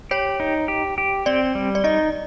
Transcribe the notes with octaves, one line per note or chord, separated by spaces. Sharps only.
G4 C#5
D#4
G4
G4
C4 D5
G3
D5
D#4 D#5